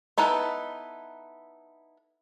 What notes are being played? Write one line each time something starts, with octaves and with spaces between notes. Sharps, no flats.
B3 D#4 E4 A4 B4